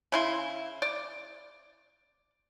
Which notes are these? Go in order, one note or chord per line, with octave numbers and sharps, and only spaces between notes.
C#3 E4 C6
D5